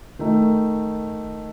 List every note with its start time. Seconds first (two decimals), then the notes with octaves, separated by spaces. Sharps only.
0.19 D#3 A3 D#4